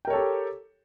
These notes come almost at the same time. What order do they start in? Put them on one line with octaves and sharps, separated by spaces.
G5 A#4 C#5 A4 G4